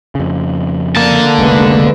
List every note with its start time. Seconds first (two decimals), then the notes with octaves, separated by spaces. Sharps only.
0.15 F2 C#3
0.97 D3 A#3 A5
1.39 F1 C2 C#3 G#3 A3 B4